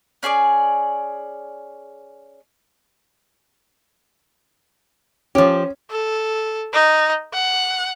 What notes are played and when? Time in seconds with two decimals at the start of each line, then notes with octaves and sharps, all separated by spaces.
0.23 C#4 G#4 C5 D5
5.35 F3 C#4 G4
5.91 A4
6.73 D#4
7.34 F#5